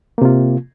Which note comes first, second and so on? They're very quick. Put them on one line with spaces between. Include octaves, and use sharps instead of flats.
A#3 C3 F4